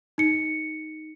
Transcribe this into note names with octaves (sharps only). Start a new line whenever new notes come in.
D#4 C#7